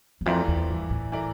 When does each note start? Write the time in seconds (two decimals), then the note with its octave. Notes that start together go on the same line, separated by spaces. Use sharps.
0.21 E2
0.26 F2 E3 A3 E4 A#4 D5
0.48 E2
0.70 G2
0.91 A2
1.12 E3 A3 E4 A#4 D5